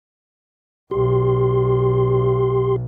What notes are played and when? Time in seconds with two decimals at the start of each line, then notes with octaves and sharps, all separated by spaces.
0.91 B1 G4 C6